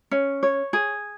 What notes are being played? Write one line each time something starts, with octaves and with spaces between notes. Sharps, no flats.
C#4
C#5
G#4